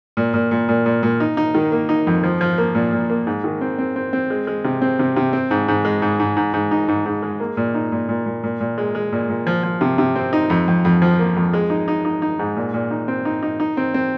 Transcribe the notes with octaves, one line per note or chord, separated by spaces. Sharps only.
A#2
A#2
A#2
A#2
A#2
A#2
D#4
D#4
D#3
A#3
D#4
F2
F3
F3
A#3
A#2
A#2
A#3
G#2
D#3
C4
C4
C4
C4
G#3
G#3
C3
C4
C3
C3
C4
G#2
G#2
G#3
G#2
G#2
G#2
G#2
D#4
G#2
G#2
G#3
A#3
A#2
D#4
A#2
A#2
A#2
A#2
A#2
G#3
G#3
A#2
A#2
F3
F3
C3
C3
C4
D#4
F2
F2
F2
F3
A#3
F2
G#3
D#4
D#4
D#4
D#4
G#2
A#2
A#2
D#4
C4
D#4
D#4
D#4
C4
C4